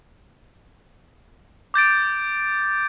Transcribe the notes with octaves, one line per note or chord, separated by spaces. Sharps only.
D6 G6 A6 D7